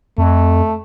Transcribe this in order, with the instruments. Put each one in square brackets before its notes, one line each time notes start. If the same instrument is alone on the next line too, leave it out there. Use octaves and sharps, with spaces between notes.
[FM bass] F2 [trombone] A3